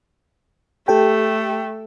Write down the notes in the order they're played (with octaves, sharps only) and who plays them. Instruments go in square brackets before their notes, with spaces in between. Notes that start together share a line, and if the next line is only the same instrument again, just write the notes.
[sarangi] A3 [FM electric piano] G4 A4 G5